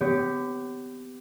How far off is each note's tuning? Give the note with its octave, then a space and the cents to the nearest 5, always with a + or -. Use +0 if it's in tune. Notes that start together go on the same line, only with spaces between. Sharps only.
B3 +35 G4 +0 C#5 +0